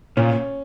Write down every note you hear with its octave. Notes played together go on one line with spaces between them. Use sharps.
A#2 C#4